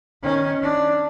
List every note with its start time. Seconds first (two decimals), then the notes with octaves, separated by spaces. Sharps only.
0.23 D#3 C#4
0.62 D4